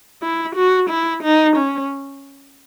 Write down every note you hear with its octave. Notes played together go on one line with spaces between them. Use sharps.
E4
F#4
E4
D#4
C#4